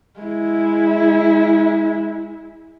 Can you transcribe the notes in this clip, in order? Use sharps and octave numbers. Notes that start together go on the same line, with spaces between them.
G#3 E4